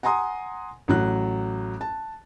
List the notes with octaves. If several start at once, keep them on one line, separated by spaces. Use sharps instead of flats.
F#5 G#5 A#5 C6 D#6
A1 F#3 F#6
A5